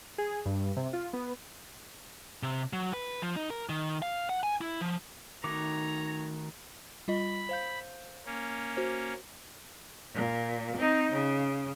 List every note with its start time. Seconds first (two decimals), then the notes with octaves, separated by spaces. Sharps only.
0.18 G#4
0.46 G2
0.76 C3
0.93 F4
1.13 B3
2.43 C3
2.73 F#3
2.94 B4
3.22 F3
3.36 D#4
3.50 A#4
3.69 D#3
4.02 F5
4.29 F#5
4.43 G#5
4.61 E4
4.81 F3
5.44 D#3 A3 D#4 F#4 C#5 A#5 D6
7.08 G3 F4 D#5 B5
7.49 C5 F5 G6
8.26 A#3 C#4
8.77 F#4 C5
10.14 A#2
10.76 C4 D#4
11.11 C#3